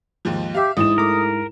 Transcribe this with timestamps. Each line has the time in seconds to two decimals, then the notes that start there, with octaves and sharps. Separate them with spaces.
0.25 D#2 G#2 F3
0.55 G4 E5 F5
0.77 A1 G#2 E4 D#6 E7
0.98 A3 A#4 D6